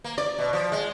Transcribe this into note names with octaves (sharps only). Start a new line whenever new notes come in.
A#3
D5
B2
F3
G#3